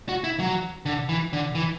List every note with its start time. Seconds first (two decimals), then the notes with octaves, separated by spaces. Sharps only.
0.09 F#4
0.24 E4
0.39 F#3
0.86 D3
1.09 E3
1.33 D3
1.55 E3